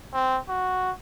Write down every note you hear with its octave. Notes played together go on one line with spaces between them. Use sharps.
C4
F#4